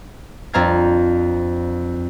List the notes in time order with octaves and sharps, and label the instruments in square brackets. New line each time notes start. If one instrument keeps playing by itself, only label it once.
[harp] F2 C4 D4 F5 A#5 G#6